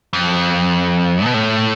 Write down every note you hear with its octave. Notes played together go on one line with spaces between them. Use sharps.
F2
B2
A2